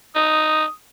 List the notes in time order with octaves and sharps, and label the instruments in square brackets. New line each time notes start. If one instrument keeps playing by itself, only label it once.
[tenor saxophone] D#4 [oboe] D#6